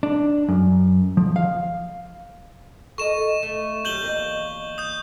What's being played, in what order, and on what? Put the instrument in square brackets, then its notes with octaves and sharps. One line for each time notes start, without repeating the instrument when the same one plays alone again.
[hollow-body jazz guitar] D4
F#2
F3
F5
[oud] A4 A#4 D#5 [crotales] C#6 E7
[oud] A3
[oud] F#2 D#3 G3 [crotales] G6 F#7 G7
[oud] E2 A#3 D#5
[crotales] D#6 G6